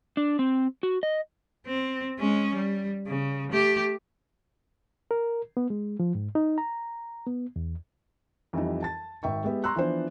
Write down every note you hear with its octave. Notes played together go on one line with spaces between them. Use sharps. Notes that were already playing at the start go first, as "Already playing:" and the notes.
D4
C4
F#4
D#5
C4
G#3 C#4
G3
C#3
A3 G4
A#4
B3
G#3
F3
G#2
D#4
A#5
B3
E2
F2 E3 G3 D#4
A5 A6
G#1 E5 G5 C#6
G#3 B3 G4 E5
A#5 C6 C#6 E6 F#6
E3 F3 B3 D4 C5